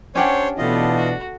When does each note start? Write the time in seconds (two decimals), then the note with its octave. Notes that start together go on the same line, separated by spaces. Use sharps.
0.15 C#4 D4 G4 C5 C#5 F#5
0.58 B2 E3 A3 B3 D4 F4 D#5
0.97 F#4